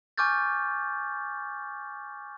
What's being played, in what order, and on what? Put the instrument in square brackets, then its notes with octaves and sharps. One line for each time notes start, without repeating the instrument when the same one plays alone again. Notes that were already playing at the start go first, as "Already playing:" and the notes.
[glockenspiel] G#5 C#6 D6 F6 G6 A6